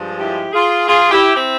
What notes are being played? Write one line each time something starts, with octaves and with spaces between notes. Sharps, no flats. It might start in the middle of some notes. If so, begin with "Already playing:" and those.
Already playing: G2 F3 G#3
E4 G4
F4 G#4
F4 G#4
E4 G4
C4 E4